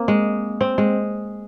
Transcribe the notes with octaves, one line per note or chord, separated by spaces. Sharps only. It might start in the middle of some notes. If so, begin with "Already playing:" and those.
Already playing: A#3 C4
G#3
C4
G#3